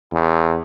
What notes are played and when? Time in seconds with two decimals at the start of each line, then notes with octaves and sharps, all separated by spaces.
0.12 E2